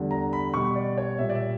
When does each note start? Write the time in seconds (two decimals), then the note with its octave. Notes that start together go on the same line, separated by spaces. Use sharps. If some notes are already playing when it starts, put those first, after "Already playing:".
Already playing: E2 D3 G3
0.11 A#5
0.33 B5
0.54 B2 G3 C#6
0.76 D5
0.98 C#5
1.19 A#2 G3 E5
1.29 D5
1.35 E5